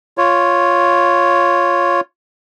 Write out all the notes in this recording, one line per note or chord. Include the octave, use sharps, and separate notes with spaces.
F4 C#5